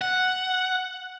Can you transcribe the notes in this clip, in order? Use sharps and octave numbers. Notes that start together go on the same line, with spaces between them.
F#5